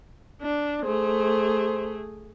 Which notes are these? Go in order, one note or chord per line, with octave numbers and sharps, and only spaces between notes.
D4
A3 G#4 C5